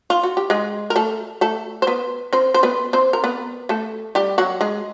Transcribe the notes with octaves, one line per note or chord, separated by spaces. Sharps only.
F4
F#4
G4
G#3 G#4
A#4
A3 A4
A3 A4
C5
B3 B4
C4 C5
C5
B3 B4
C4 C5
A#4
B3 B4
A3 A4
G3 G4
F#3 F#4
G#3 G#4